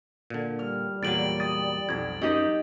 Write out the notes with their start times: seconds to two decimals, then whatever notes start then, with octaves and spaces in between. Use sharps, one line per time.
0.30 A#2 D3
0.59 G3 F6
1.03 E2 A#2 F#3 A6 D7 F#7
1.40 D#6 A6
1.89 B1 F2 G#6
2.22 F#2 D#4 G4 D#5